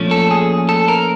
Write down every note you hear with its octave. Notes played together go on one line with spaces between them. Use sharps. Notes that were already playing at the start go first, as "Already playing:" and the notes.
Already playing: A#2 F3 A3 C#4
A4
G#4
A4
A#4